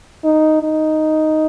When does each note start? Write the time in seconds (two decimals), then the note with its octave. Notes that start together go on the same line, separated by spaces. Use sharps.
0.24 D#4
0.63 D#4